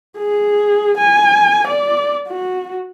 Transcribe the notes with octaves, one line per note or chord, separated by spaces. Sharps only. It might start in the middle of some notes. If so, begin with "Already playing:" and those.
G#4
G#5
D5
F#4